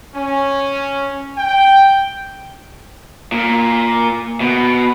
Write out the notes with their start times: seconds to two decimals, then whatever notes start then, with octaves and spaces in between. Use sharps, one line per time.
0.16 C#4
1.37 G5
3.32 A#2
4.41 B2